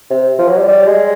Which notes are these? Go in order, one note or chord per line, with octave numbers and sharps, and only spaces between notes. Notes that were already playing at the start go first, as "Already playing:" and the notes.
C3
F3
F#3
G3
G3
G#3